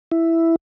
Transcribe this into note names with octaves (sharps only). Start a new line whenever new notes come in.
E4